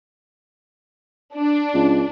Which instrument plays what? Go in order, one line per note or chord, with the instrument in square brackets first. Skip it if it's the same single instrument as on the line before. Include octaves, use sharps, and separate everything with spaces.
[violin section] D4
[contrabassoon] C#2